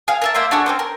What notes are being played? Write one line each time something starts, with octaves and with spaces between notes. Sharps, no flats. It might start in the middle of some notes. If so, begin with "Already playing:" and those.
G#4 F5
A#4 E5 A5
A#3 C5 E5 C6
D4 F#4 G#4 A4
C4 C#4 C5
A#4